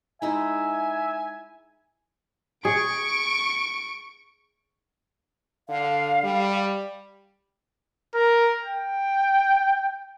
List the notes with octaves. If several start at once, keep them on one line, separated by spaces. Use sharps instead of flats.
G#3 D#4 E4 E5 G#5
G#4 C#6 D7
D3 F5
G3
A#4
G5